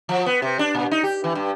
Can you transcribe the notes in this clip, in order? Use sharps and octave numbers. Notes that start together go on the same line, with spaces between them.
F3
B3
C3
D4
A#2
D#4
G4
E3
G2